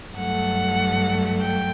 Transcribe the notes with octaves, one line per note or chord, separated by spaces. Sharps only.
G2 F#3 A3 F#5
G5